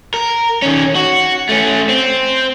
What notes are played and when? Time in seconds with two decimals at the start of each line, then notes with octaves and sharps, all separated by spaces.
0.14 A#4
0.62 D#3 C#4
0.95 F#4
1.49 A3 C#4
1.89 C4